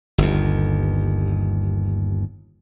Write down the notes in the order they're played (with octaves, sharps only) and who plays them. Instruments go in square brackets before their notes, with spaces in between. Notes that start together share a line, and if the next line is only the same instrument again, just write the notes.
[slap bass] G1 D#2